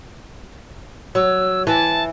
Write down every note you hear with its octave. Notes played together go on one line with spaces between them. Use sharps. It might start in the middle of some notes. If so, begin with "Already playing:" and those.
F#3 E6
E3 A5